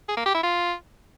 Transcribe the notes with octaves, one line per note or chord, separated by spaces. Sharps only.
G#4
A#3
G4
E4
F4